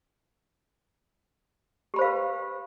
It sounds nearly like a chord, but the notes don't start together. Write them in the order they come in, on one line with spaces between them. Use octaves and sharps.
G4 B5 C5 F5 B4